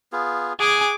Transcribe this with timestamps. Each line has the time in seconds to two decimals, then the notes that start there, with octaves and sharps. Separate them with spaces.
0.12 B3 F4 G#4
0.59 G#4 F#5 G#5 D6